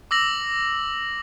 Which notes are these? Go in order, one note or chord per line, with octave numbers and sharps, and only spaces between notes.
D6 E6 A#6 F#7